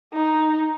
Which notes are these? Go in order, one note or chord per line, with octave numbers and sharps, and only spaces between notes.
D#4